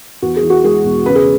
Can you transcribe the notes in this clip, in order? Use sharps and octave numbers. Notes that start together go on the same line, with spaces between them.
E2 F#4
G#4
E3
F#4
G#3 G#4
E1
C#3 B4
G#4